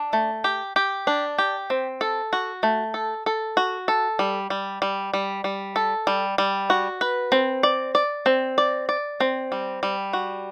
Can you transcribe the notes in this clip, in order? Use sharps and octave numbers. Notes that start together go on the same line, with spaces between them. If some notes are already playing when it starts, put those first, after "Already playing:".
Already playing: D4
A3
G4
G4
D4
G4
C4
A4
F#4
A3
A4
A4
F#4
A4
G3
G3
G3
G3
G3
A4
G3
G3
F#4
B4
C4
D5
D5
C4
D5
D5
C4
G3
G3
F#4